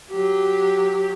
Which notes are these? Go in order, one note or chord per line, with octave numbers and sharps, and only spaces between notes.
F#3 G4